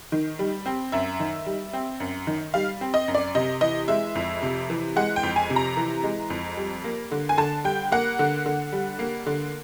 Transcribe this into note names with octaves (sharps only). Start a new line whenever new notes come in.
D#3
G3
C4
F#2 E5
D#3
G3
C4
F#2
D#3
G3 F5
C4
D#5
F#2
D5
C3 D#5
E3 D#5
G#3 E5
F2
C3
E3
G#3 F#5
G5
F2
G#5
C3
A#5
E3
G#3
F2
G3
A#3
D3
G#5
D3 A5
G3 G5
A#3 F#5
D3
D3
G3
A#3
D3